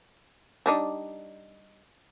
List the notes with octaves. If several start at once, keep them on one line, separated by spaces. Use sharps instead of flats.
G3 D4 D#4